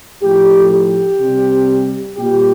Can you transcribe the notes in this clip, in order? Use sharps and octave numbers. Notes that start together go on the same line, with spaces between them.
A2 F3 A3 G4
G4
C3 G3
A#2 G3 G4